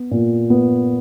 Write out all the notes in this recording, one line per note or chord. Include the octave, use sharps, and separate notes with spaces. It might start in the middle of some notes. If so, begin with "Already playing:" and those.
Already playing: B3
A#2
B3